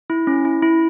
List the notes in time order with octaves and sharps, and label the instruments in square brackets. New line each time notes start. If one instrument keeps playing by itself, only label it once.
[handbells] E4
C#4
E4
E4